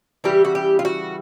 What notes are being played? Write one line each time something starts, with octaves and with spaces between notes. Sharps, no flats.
C#3 E3 G3 G4
F#4
G4
F4
F#4